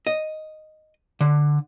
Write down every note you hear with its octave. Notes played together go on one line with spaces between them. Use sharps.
D#5
D3